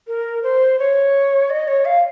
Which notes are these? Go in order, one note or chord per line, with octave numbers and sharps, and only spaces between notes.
A#4
C5
C#5
D#5
C#5
F5